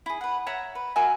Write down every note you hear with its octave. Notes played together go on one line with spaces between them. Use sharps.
E4 G#4
B4 F#5
C#5 E5 F#5 A#5
B4
F#4 A#4 E5 G#5